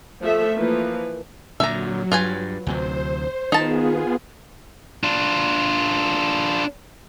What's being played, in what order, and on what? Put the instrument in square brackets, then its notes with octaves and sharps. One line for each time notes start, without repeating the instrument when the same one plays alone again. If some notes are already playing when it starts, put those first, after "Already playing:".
[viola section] F3 A3 E5
E3 F3 A#3 B4
[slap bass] A#2 D3 [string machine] F#3 [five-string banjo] E5 A#5
[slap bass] G2 [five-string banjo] F4 B4 G#5
[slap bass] D2 C3 F#3 [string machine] C5
[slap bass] D#3 [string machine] B3 F4 G#4 [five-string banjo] D#4 A5
[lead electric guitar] D4 F4